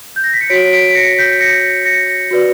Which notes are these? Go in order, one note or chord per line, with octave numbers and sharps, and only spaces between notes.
G6
A#6
B6
C#7
F#4 C#5 B6 D7
B6 D7
B6
A#6 C#7
G6 B6
A#6 C#7
A#6 C#7
F#4 B4 D5